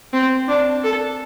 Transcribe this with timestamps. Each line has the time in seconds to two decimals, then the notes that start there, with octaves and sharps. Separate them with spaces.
0.13 C4
0.48 D4
0.84 A4